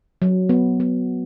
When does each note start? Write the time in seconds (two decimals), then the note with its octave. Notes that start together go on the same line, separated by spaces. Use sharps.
0.22 F#3
0.49 B3
0.80 B3